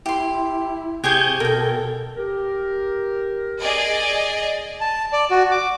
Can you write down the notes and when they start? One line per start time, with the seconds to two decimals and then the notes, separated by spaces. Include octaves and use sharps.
0.06 E4 G4 C6
1.04 C3 G4 G#4 C#6 G6 G#6
1.40 B2 A4 A#4 G5
2.16 G4 A#4
3.62 G#4 D5 D#5
4.81 A5
5.13 D5
5.31 F#4
5.51 D6